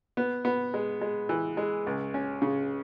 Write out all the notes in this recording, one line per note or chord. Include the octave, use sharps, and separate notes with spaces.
B3
B3
G#3
G#3
E3
G#3
C#2
C#4
C#3